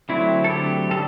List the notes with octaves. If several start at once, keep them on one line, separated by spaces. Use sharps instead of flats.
D3 F#3 A3 C4 E4
A4
G4
D3 G3 A4